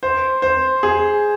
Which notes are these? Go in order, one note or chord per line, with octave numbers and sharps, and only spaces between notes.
C5
C5
G#4